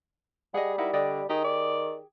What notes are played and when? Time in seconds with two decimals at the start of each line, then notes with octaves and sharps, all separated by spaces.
0.54 G3 G#4 D#5 F#5
0.78 D#4 E4 A#4 F#5
0.93 D3 D5 D#5 G5
1.29 D#3 D#4 G4 G#4
1.44 D5